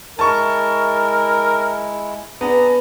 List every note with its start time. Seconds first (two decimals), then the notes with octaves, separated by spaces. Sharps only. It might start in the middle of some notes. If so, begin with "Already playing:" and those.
0.19 G#3 E4 A#4 A5 C#6
2.41 B3 D4 G#4 A#5